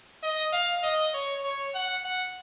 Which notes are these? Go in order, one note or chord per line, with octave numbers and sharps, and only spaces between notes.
D#5
F5
D#5
C#5
C#5
F#5
F#5